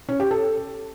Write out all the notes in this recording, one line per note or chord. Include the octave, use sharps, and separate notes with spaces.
C#4
G4
A4